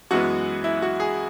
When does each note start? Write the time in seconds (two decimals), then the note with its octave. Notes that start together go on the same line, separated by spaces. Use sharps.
0.11 F#2 E3 G#3 B3 F#4
0.64 E4
0.82 F#4
1.00 G#4